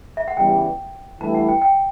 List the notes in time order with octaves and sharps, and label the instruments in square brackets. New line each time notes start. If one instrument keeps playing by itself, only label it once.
[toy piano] E5
F#5
[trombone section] C#3 E3 G3 B3 [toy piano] G5
[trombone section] G2 E3 A3 E4 G4 [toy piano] A5
[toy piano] F#5
G5
G5